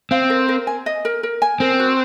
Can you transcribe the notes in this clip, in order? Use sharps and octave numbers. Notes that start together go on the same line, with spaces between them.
C4 F5
A#4
A#4
G#5
D#5
A#4
A#4
G#5
C4 A#4
F#4